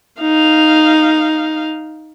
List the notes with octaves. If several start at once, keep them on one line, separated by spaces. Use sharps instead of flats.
D#4 F5